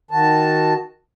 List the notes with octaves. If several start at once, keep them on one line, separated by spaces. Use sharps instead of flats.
D#3 F#4 A5